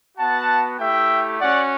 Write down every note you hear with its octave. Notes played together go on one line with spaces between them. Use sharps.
B3 F#4 F#5 A5
A3 E4 G4 E5 G5
C#4 F#4 D5 F#5